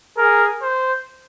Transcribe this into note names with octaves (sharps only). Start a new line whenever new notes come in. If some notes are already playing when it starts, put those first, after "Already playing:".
G#4 A#4
C5